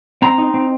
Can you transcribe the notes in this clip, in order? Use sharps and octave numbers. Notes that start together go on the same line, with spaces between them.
C4 A#5
D#4
C4